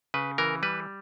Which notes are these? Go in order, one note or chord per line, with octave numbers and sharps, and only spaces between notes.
C#3 B4
E3 A#4
G3 B4